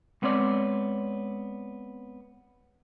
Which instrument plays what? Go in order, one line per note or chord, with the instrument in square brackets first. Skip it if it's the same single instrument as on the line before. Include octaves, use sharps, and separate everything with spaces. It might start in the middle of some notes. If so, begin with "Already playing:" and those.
[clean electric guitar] G#3 B3 C4 C#5 D5